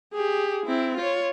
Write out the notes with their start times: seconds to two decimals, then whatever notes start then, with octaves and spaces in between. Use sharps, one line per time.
0.14 G4 G#4
0.66 C4 E4
0.98 F4 C#5